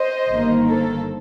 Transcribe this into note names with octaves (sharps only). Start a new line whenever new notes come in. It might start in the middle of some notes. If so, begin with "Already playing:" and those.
Already playing: C5 D#5
G1 G2 D#3 A#3
A4 C5